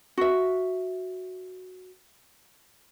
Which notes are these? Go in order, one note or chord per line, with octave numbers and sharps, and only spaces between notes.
F#4 E5